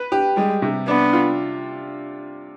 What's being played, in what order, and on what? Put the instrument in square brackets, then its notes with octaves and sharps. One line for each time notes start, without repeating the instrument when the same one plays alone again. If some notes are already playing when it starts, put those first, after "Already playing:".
Already playing: [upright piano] B4
G4
[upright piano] G3 [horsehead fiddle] G#3
[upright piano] C3
[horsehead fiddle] B3 [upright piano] D4
[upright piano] F4